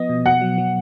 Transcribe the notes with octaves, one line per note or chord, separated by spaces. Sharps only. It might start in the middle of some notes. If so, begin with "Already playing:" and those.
Already playing: F3 B3 D#5
B2
B2 F#5
F#3
F#3